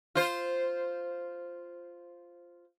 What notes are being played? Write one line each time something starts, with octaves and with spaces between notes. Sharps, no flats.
F4 C5